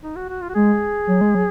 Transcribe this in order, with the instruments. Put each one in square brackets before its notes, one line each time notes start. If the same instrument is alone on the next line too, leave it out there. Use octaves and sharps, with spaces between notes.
[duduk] D#4
F#4
F#4
F4
F#4
[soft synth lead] G#3 [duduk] G#4
[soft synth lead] F#3
G#3
F#3